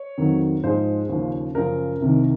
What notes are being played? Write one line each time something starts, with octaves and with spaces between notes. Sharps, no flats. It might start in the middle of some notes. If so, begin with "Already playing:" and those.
Already playing: C#5
F2 D#3 F#3
G#2 F3 G#3 C5
D#2 C#3 F3
F#2 C#3 F3 A#4
C2 C3 D#3